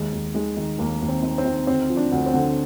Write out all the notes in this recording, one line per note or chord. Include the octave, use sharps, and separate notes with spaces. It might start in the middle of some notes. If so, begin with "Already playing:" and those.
Already playing: D#2 G#3
D#2
D#3 G#3
D#3
D#2 A#3
D#2
C4
D#3
C4
D#3
D2 C4
F3
D4
D2
C4
D3